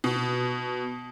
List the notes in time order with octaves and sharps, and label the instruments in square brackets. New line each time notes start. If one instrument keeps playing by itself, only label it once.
[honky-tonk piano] B2